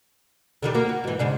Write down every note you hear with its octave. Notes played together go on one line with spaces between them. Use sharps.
D3 D#3 G3
A#3 F#4 A#4
F#4
G#2 E3
G#2 C#3 D4